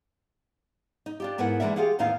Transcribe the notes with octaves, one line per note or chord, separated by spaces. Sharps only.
D#4
D4 F4 G4
G#2 B3 E4 A#4 B4 F#5
E3 G#3 A#3 D4 A#4 E5
F4 G4 G#4 F5 F#5
D#2 A2 B3 D#4 E4 F5